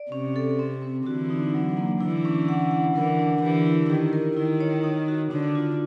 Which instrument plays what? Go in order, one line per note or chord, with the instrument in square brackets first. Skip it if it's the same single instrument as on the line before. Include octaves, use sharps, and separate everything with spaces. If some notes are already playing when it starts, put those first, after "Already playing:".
Already playing: [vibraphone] D5
[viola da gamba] C3 [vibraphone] C#4
[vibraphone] A4
C4
C4
[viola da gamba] D3 E3 [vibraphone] F#4
[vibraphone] D#4
F#3
A#3
[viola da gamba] D3 E3 [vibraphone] E4
[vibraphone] C#4
F#5
F#5
[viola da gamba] D3 E3 [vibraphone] A#4
[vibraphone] D4
[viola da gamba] D3 E3 [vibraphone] G4
[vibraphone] E4
[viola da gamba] D#3 [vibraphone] G4
[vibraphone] A#4
[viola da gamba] D#3 [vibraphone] E4
[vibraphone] C#5
D#4
F#4
[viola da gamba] D3 [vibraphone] D4
[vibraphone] F4